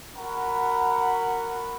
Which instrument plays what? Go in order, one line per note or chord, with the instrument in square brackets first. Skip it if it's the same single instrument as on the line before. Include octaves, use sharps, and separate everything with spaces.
[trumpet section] F#4 A#4 F#5 B5